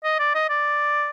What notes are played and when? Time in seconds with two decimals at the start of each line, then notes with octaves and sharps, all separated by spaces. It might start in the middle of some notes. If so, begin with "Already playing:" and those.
0.04 D#5
0.19 D5
0.35 D#5
0.49 D5